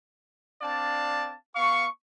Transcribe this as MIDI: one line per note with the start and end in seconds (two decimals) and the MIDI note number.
0.62 1.34 60
0.62 1.34 62
0.62 1.34 74
0.62 1.34 77
0.62 1.34 81
1.55 1.86 59
1.55 1.86 77
1.55 1.86 85